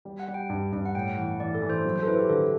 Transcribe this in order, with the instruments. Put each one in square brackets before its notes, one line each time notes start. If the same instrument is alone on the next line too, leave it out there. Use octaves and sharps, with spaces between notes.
[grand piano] G3
[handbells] F#5
[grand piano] G3
[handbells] G5
[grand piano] G2
G2
[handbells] F#5
[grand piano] A2 [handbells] G5
[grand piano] E3 [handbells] F#5
[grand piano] E3 [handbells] D5
[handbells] A4
[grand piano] E3
[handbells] C5
[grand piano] F#3
[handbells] C5
A4
[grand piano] E4 [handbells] B4
[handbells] G4
[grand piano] D3 [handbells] A4